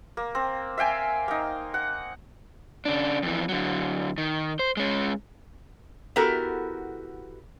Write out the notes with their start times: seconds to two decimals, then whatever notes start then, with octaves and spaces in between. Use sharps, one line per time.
0.17 A#3
0.35 C4
0.78 E5 F5 G5 G#5
1.28 A#3 D#4
1.74 F#5
2.85 C#3 D4
3.22 F2 E3
3.49 D3 F#3
4.18 D#3
4.59 C5
4.77 G#3 C#4
6.16 B3 E4 F#4 G4 A4 A#4